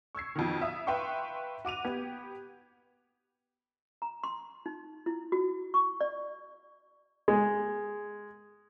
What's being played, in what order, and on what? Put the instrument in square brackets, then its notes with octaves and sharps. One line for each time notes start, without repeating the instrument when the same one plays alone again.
[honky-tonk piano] C#6 E6 G#6 C7
F2 B2 D#3
E5 F5 D#6
B4 E5 F5 G5 C6 C#6
F#4 D6 D#7 F7
B3 G4 G#6
[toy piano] A#5
C6
D#4
E4
F#4
C#6
D5
[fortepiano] G#3